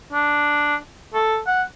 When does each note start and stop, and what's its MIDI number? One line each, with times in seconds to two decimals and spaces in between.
0.13 0.76 62
1.14 1.39 69
1.47 1.63 78